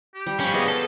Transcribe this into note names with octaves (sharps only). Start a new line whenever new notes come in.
G4
G3
F3 C#4
B3 G#4 D#5
F4 A4